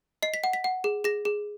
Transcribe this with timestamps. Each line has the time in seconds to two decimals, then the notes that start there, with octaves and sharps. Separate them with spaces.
0.22 D#5 C7
0.34 B6
0.44 F#5
0.53 B6
0.64 F#5
0.84 G#4
1.04 G#4 A#6
1.25 G#4